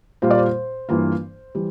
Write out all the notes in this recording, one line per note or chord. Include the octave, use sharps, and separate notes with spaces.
A#2 G3 A#3 F4 C5
D5
C5
G2 E3 A#3 F4
E3 G3